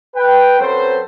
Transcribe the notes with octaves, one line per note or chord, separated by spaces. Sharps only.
B4 G5
F#3 C4 C#4 A4 B4 C5